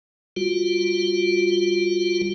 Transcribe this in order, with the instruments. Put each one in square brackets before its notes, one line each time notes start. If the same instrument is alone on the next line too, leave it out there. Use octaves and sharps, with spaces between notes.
[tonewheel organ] G3 F4 F#4